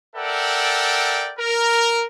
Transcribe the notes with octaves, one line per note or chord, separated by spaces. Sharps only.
A4 A#4 D5 E5 F#5 G5
A#4